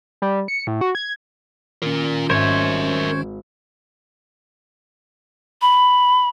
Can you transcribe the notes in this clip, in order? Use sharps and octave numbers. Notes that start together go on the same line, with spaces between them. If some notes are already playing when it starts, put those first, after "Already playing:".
G3
C#7
A2
F#4
G#6
D#3 C#4 F4 A#4
G#1 A#4 C5 C#5 E5
B5